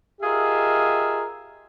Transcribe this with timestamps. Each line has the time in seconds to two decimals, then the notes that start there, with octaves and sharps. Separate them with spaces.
0.21 F4 G4 G#4 A#4 D#5 E5